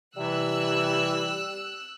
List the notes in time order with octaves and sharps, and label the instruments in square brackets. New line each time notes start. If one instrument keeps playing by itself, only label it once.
[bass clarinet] C3 [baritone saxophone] E3 [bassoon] G3 [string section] E6 F#6